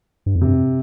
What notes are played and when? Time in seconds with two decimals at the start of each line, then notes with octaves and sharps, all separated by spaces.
0.26 G2
0.36 F2
0.41 G2 C3